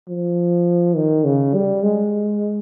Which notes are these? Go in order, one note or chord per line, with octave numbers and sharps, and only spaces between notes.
F3
D#3
C#3
G3
G#3